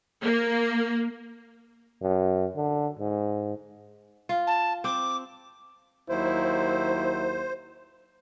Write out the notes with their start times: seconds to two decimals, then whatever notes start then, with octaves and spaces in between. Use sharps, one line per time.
0.22 A#3
2.02 F#2
2.56 D3
2.99 G#2
4.29 F4
4.47 A5
4.84 C4 D6
6.09 D#2 F#3 E4 C5